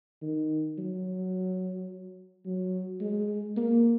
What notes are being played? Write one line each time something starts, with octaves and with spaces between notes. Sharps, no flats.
D#3
F#3
F#3
G#3
A#3